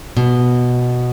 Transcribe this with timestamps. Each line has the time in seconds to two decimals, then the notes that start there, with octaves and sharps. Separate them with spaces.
0.17 B2